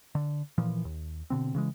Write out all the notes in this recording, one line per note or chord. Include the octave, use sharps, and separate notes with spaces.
D3
A#2 E3 F3
D#2
B2 D3 C4
C#3 E3 G#3